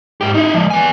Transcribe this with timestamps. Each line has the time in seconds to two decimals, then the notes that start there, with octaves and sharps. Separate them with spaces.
0.21 G#2 G4
0.35 D#4 E4
0.54 F3 G#3
0.70 B3 G#5